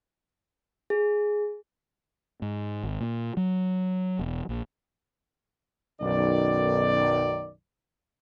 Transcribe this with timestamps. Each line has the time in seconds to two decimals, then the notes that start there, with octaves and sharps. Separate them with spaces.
0.90 G#4
2.42 G#2
2.83 G#1
3.01 A#2
3.37 F#3
4.19 E1
4.49 A#1
6.01 B1 F#2 D#3 D5